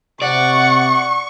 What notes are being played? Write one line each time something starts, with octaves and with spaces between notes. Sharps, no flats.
C3 D5 F#5 C#6